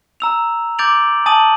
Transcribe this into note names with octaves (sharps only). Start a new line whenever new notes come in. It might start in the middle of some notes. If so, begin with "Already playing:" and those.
A#5 E6 F7
D6 G6 A6 D7 F7 F#7
G#5 A5 D#6 A6 D#7 F#7